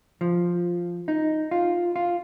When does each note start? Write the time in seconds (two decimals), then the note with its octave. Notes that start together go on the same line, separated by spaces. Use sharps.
0.21 F3
1.08 D#4
1.51 F4
1.96 F4